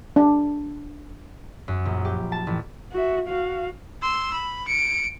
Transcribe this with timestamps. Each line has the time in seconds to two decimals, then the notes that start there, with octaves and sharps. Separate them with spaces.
0.16 D4
1.68 F#2
1.85 A#1
2.05 G4
2.32 A5
2.47 A1
2.92 F#4 E5
3.28 F#4 F5
4.02 C6 E6
4.33 B5
4.68 C#7 D7